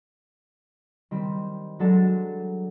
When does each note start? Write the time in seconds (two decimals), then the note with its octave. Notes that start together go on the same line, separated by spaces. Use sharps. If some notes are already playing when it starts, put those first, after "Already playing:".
1.11 D#3 G3 C4
1.79 F#3 G#3 D4 A4 E7